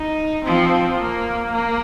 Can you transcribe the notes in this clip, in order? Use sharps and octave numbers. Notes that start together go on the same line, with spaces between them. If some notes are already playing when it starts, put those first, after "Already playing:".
Already playing: D#4
F3 C4
A#3
A#3